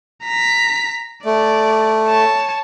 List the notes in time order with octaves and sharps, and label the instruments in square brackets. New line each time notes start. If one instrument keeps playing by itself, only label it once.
[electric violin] A#5 B6
[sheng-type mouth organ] A3 [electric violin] D5
[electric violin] C#5 A5